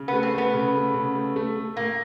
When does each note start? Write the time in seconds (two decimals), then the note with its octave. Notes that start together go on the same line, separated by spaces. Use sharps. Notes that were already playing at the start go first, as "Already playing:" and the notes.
Already playing: C#3
0.08 A3 B3
0.23 C4
0.34 A3 B3
0.54 C#3
0.74 A3
0.94 C#3
1.15 A3
1.36 A3
1.56 A3
1.76 A2 A#3